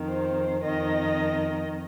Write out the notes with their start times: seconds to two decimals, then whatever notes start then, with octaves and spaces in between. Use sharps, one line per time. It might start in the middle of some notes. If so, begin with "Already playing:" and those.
Already playing: F2 D#3
0.08 C5
0.63 F2 D#3 D#5